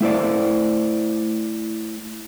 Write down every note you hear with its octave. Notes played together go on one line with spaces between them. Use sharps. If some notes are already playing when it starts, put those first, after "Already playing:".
A3 E4 C5 D5